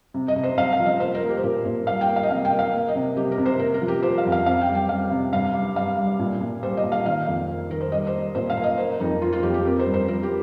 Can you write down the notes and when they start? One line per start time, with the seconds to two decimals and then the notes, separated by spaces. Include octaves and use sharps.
0.14 C3
0.28 D#5
0.36 C3
0.43 C5
0.58 C3 F5
0.73 F5
0.80 F3
0.86 D#5
1.00 A#3 C5
1.15 A#4
1.23 A#3
1.29 G4
1.37 C5
1.43 A#2 A#4
1.65 A#2 C5
1.87 G3 F5
2.01 G5
2.09 A#3
2.16 F5
2.23 D#5
2.30 C3 F5
2.45 G5
2.52 A#3
2.59 F5
2.74 A#3
2.88 D#5
2.95 C3
3.17 C3 G4
3.32 A#4
3.38 C3
3.46 C5
3.59 A#3 A#4
3.74 A#4
3.82 F3
3.88 G4
4.03 F3 C5
4.18 F5
4.25 F2
4.32 F5
4.46 C4 F5
4.61 G5
4.68 G3
4.75 G5
4.89 G3 F5
5.11 C3
5.32 G2 F5
5.54 G3
5.76 G2 F5
5.98 G3
6.19 A#2
6.41 A#2
6.63 G3 C5
6.77 D#5
6.84 A#2
6.92 F5
7.06 D#3 F5
7.28 F2
7.49 A#3
7.70 D#3 A#4
7.81 C5
7.92 G3 D#5
8.07 C5
8.14 A#3
8.35 A#2 C5
8.50 F5
8.57 A#3
8.64 D#5
8.78 A#3 C5
9.00 F2 D#4
9.21 A#3 F4
9.32 F4
9.43 F2 G4
9.54 G4
9.65 C4 A#4
9.79 C5
9.87 G2
9.94 C5
10.08 F3 A#4
10.23 G4